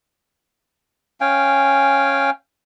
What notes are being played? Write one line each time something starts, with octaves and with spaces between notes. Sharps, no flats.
C#4 F5 G5 G#5